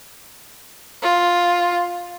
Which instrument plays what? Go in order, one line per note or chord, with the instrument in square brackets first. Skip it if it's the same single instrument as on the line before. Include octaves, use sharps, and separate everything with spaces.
[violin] F4